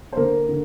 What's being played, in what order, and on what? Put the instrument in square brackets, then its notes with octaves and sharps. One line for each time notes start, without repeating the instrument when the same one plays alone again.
[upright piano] C5
D3 A#3 A#4
D3